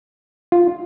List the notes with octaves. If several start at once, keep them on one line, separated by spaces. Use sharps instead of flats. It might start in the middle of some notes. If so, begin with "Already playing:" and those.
F4